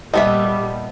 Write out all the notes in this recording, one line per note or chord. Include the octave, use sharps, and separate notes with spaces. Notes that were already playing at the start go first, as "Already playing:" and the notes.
A#2 G3 A3 B3 G4 D#5 E5